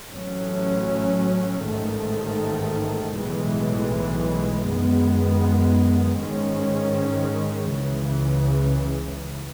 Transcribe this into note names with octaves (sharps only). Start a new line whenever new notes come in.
A1 A2 F#3 C#4
A1 G#2 D#3 A3
B1 A2 E3 G#3
F#2 D#3 G#3 B3
G#2 D#3 G#3 C#4
C#2 C#3 E3